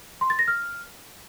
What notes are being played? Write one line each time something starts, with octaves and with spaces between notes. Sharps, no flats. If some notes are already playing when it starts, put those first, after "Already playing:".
C6
A6
A#6
F6